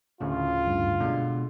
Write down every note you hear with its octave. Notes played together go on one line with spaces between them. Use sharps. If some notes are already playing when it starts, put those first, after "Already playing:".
D2 A2 C#3 F4
G2
B2 D3 G#3